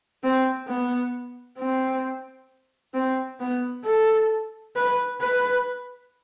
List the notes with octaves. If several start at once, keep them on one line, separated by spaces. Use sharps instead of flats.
C4
B3
C4
C4
B3
A4
B4
B4